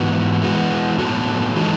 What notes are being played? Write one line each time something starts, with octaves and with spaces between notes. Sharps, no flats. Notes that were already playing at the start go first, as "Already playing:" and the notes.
Already playing: G#2 E3 B3 F#4
E3 G#3 B3 F#4
A2 F#3 B3 F#4 A4
E3 G#3 D#4 A4